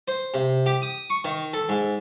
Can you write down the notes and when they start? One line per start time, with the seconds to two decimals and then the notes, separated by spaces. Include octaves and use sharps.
0.08 C5
0.34 C3
0.66 G4
0.82 D#6
1.10 C#6
1.25 D#3
1.53 A4
1.69 G#2